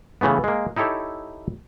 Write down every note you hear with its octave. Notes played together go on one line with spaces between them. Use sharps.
C#3 E3 A3 B3
G#3 A#3
D#4 E4 G4 A4 C#5